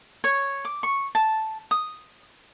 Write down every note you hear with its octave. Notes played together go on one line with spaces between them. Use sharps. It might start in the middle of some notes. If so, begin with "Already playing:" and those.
C#5
D6
C#6
A5
D#6